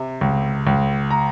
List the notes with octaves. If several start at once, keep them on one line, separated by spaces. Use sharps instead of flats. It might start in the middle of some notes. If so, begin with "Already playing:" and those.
Already playing: C3
C#2
C#2
A#5